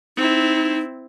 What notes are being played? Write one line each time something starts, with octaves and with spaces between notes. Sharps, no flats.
C4 D#4 E4